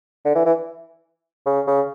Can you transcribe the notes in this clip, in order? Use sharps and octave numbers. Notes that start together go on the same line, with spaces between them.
D3
E3
E3
C#3
C#3